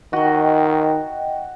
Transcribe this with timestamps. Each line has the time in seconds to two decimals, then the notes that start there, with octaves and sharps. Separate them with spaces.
0.13 D#3 F#4 D#5 G5